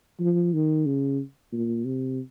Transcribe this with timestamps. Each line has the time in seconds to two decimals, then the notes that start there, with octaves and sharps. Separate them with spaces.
0.20 F3
0.53 D#3
0.86 C#3
1.53 A#2
1.85 C3